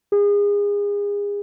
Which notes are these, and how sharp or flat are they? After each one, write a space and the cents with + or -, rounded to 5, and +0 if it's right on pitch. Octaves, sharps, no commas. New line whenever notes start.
G#4 -30